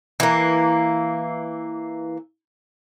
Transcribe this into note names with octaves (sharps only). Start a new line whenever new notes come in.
E3 A#3